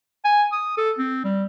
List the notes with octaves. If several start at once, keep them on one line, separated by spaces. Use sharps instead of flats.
G#5
D#6
A4
C4
G3